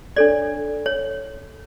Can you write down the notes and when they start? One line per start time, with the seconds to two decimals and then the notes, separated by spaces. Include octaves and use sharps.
0.16 D4 A4 C#5 D5
0.86 C#5